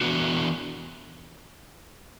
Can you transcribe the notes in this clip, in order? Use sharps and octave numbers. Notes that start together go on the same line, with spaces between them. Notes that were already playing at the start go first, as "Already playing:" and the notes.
E3 B3 D4 F#4